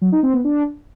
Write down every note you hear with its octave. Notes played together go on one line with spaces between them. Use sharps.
F#3
D#4
C4
B3
D4